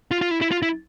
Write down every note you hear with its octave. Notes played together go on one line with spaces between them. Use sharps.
F4
F4
E4
E4
F4
E4